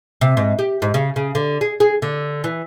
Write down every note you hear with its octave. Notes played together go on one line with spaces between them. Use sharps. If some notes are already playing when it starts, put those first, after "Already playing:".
C3
G#2
G4
G#2
C#3
C#3
D3
G#4
G#4
D3
E3